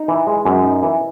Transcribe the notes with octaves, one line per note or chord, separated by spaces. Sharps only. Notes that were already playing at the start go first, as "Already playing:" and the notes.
Already playing: D#4
E3
G#3
F#2
D#4
E3